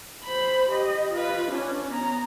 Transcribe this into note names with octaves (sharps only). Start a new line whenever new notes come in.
C5 B5
G4 D#5
F4 B4
C#4 D4
B3 A#5